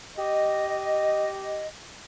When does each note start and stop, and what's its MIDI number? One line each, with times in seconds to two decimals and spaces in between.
0.17 1.69 67
0.17 1.69 75